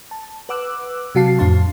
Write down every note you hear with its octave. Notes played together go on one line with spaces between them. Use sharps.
A5
B4 F#5 D6 E6 F#6
C3 F#3 F#4 F5 A5 C7
F2 A2 D4 F5 A5 C6